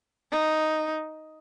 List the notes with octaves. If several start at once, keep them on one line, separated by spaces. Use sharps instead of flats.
D#4